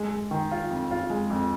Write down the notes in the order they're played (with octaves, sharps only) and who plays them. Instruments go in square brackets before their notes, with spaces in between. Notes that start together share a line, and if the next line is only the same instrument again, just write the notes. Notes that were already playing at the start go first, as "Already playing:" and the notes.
Already playing: [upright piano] G#3
G#3
D#3
F4
F2
F4
G#3
F2